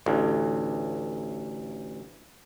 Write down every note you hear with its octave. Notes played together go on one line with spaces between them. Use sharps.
A1 D2